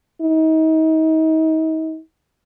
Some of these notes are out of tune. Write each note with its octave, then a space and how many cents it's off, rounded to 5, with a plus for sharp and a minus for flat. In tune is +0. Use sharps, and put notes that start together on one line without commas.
D#4 +35